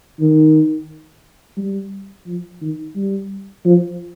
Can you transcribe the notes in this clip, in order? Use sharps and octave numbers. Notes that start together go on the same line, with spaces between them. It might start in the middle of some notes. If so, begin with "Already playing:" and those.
D#3
G3
F3
D#3
G3
F3